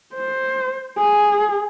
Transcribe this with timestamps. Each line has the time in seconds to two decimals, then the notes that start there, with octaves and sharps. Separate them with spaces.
0.14 C5
0.98 G#4